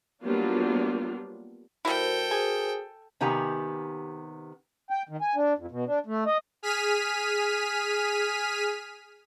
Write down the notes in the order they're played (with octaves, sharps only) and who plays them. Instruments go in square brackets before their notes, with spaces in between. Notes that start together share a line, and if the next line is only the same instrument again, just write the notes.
[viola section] F#3 G3 A#3 B3 D4 F4
[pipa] G3 E4 [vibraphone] F#4 A#4 C5 [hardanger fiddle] A4 G5
[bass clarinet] G#4 [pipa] G#5
[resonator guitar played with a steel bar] C3 D#3 B3 G4 G#5 A#5
[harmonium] G5
D#3
G#5
D4
F2
B2
D4
A3
D#5
[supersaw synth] G#4 F6 B6 D#7